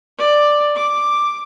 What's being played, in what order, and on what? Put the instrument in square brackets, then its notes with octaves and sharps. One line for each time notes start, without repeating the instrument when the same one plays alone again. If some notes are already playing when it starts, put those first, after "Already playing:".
[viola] D5
D6